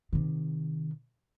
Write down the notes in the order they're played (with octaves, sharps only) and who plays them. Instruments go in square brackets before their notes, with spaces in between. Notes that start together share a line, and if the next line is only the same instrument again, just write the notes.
[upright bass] C3 D#3